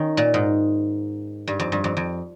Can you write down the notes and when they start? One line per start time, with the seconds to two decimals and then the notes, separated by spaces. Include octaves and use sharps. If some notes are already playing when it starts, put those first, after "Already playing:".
Already playing: D#3 C#4 D#4
0.17 A#2
0.34 G#2
1.48 G2
1.60 F2
1.72 G2
1.84 F2
1.97 F2